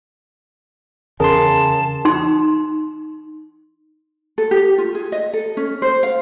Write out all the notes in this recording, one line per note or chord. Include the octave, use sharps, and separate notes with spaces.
E2 C#3 G#4 A#4 A5 C6
D#4 C6
A4
G4
F4
G#4
D#5
A4
C#4
C5
F5